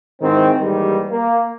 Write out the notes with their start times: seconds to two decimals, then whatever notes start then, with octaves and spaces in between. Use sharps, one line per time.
0.22 G#2 D#3 E3 C4
0.60 D#2 G#2 D#3 E3 G3
1.10 A#3